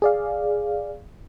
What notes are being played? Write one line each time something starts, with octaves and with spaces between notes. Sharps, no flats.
G#4 D5 F5